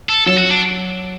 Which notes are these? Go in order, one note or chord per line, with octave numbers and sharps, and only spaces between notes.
A4
F#3 A4
F#4
D4